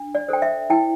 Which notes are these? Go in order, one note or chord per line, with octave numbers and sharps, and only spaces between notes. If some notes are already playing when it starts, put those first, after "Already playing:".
Already playing: D4
D5
A4 C5 G5
E5
E4 G5